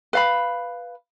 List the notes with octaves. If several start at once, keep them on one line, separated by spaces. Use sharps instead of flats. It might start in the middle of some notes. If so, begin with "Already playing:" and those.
B4 F5 B5